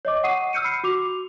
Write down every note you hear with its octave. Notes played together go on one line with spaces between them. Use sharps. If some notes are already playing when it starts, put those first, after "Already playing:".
C#5 D#5 D6
F#5 C#6 D#6 C7 D#7
E6 F6 G6 C#7 D#7
B5 C7
F#4 D6 F7